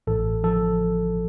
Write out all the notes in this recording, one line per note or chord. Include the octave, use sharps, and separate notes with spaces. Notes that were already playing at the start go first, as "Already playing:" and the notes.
A1 A4
F3 A4